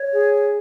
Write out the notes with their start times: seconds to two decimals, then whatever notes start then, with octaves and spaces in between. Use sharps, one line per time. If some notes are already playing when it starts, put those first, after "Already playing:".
Already playing: C#5
0.12 G#4